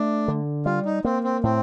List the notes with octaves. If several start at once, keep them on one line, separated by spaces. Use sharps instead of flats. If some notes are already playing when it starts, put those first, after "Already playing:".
Already playing: A3 D4
D3
G3 F4
D#4
A#3 C4
C4
A2 C4